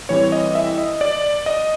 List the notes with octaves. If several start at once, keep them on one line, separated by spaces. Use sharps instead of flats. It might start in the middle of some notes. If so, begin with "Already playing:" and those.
A2 E3 G3 C4 C#5
D#5
E5
D#5
D5
D#5